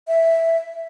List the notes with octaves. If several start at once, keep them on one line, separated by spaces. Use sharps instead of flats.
E5